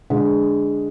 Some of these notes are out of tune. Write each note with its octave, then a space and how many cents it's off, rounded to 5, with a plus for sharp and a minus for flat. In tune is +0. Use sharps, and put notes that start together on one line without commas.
D3 +5 G#3 +0